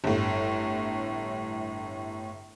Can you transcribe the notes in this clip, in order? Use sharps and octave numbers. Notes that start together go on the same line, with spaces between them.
G1 A2